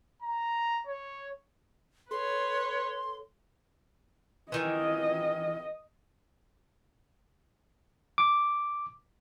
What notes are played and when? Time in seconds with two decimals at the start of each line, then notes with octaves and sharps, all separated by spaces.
0.22 A#5
0.87 C#5
2.11 A4 B4 C#5 C6
4.52 D#3 E3 D#5
8.18 D6